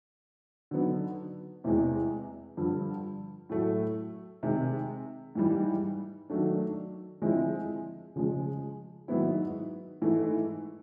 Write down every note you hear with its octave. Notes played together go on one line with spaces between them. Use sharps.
D3 F#3 B3 D#4
E2 C3 E3 G#3
G2 D3 F3
A2 F#3 A3
C3 D#3 G#3
G#2 E3 G3
D#3 F#3 A3 D4
D3 F3 G#3 C4 E4
C#3 F3 G#3
G#2 D#3 F#3 B3 E4
G#2 E3 A3